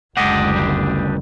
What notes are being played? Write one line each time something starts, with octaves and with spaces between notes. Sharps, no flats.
F#1 D2 G#3 D4 G4 D#5 F#5
C#3 G3